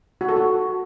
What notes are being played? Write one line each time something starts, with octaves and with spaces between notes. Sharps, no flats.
F#4
A4
F#4